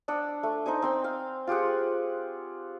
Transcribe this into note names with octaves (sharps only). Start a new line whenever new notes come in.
D4 D#5 F#5 E6
A3
D#4 C5 D#5 G#5
C4 C6 E6
F5
F4 G4 G#4 F#5